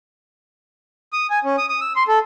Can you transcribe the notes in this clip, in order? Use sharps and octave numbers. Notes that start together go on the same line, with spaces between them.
D#6
G#5
C#4
D#6
D#6
E6
C6
A4